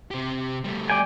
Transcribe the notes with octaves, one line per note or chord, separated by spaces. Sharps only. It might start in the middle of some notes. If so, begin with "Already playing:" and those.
C3 G4
G3 A3
D5 G5 G#5